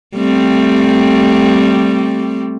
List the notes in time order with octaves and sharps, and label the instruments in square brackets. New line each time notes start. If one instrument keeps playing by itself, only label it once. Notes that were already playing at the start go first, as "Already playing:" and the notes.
[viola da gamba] G3 A3 C4